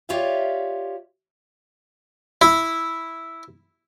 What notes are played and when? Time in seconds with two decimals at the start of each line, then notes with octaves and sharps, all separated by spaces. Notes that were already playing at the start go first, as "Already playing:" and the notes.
0.09 F4 G4 C#5 D5 E5 F5
2.42 E4